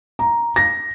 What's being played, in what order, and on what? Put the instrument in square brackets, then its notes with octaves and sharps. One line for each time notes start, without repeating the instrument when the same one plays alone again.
[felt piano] A#5
A#6